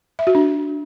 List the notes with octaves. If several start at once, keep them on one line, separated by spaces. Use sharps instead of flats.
E5
F#4
D4